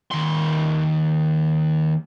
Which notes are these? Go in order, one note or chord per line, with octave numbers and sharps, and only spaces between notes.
D#2 C6